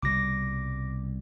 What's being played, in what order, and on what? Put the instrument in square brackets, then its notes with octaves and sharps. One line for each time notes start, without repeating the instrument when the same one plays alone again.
[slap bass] C2 B2 G3 [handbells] D6 A#6